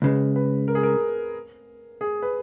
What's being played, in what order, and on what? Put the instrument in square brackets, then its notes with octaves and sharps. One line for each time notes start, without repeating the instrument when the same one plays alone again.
[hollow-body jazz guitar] C#2 C#3 G#3 [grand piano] B4
[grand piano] B4
A#4
G#4
A#4
G#4
B4